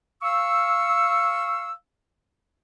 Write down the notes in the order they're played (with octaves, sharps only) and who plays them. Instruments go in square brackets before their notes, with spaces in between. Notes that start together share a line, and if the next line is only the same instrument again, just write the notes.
[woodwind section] F5 C#6 E6